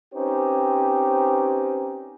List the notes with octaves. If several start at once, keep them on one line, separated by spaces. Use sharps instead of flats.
C4 C#4 D#4 G4 B4 C5